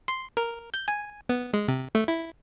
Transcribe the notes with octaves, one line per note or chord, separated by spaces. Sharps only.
C6
A#4
G6
G#5
B3
G#3
C3
A3
E4